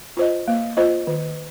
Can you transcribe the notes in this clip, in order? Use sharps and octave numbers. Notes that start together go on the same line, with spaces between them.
F4 C5 D#5
A#3
F4 C5 D#5
D#3